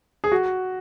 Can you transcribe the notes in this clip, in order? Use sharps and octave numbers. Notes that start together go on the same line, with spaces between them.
G#4
F#4